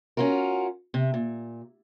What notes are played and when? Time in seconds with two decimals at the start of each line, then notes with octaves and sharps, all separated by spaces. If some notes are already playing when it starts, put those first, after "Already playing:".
0.17 C#4 D4 F4 F#4 A#4
0.94 C3
1.14 A#2